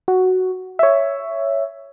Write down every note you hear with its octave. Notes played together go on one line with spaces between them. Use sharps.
F#4
C#5 E5